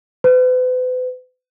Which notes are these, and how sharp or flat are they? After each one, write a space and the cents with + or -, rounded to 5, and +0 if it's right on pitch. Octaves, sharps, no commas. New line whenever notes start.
B4 +40